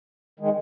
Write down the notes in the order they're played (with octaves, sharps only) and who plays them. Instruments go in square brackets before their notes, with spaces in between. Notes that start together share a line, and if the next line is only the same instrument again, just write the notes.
[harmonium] D#3 G#3